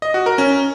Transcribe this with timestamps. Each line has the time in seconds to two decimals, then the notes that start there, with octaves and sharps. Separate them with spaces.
0.02 D#5
0.14 F#4
0.26 A#4
0.38 C#4